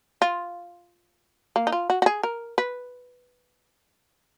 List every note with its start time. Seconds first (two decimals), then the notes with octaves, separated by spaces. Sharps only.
0.22 F4
1.56 A#3
1.67 D#4
1.72 F4
1.90 F#4
2.02 F#4
2.06 G#4
2.23 A#4
2.58 B4